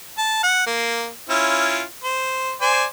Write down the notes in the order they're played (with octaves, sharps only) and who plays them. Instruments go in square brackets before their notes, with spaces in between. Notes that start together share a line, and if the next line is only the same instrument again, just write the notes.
[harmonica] A5
F#5
A#3
C#4 E4 F4
C5
C5 D5 G#5